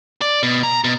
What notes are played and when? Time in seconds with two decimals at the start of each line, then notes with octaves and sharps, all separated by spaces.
0.21 D5
0.43 B2
0.63 A#5
0.84 B2